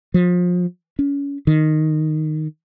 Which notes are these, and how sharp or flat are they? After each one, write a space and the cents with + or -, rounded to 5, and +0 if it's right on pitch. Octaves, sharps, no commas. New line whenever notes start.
F3 +30
C#4 +25
D#3 -5